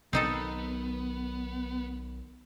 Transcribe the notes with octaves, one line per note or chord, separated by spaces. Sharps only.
B1 D#3 B3 C4 D#4 A4